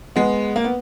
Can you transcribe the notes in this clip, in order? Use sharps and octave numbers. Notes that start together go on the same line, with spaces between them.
G#3 B3
A#3
B3